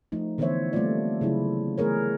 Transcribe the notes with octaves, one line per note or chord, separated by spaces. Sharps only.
F3 A3 D#4
D3 E3 B3 C5 C#5 E5
G3 A3 A#3 C4 F4 D5
C#3 F#3 E4 F4
E3 A3 B3 G#4 A#4 C#5